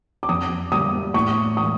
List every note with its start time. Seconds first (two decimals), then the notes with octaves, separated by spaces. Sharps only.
0.23 D6
0.29 F2 D#6
0.72 D3 G3 A#3 D#6
1.14 A2 C#6
1.57 E3 G#3 D#6